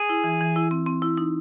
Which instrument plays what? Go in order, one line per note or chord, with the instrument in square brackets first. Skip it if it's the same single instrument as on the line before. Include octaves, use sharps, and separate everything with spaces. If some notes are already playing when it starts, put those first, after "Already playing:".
Already playing: [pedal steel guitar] G#4
[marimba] E4
E3
E3
E4
C4
C4
E4
D#4